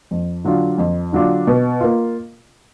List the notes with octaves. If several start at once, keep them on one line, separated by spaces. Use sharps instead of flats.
F2
D3 F#3 D4 F4
F2
D3 F#3 D4 F4
B2
A#3 F4